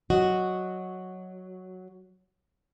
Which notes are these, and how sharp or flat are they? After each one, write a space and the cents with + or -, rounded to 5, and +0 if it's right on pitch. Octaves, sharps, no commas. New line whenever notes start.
F#3 +0 F#4 +0 D#5 +0